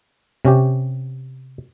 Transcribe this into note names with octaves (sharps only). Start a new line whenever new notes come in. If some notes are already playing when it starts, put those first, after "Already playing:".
C3 C#4 G4